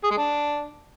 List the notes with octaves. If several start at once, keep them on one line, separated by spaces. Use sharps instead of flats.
G#4
G#3
D4